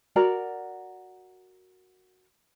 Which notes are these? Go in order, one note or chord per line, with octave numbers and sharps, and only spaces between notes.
F#4 A#4 D5 A#5